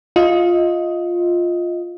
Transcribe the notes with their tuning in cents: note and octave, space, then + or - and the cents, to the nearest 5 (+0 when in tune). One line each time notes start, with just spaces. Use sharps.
F4 +5 D#5 +15